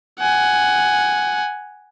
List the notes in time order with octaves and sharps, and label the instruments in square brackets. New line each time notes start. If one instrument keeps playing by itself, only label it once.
[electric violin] F#5 G#5